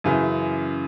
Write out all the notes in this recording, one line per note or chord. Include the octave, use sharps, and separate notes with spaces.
F#2 C#3 E3